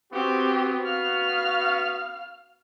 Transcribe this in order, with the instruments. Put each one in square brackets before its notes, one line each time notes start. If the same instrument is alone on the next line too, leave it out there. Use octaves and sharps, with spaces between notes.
[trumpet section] B3 F#4 [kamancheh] C4 G4
[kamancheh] F5 F6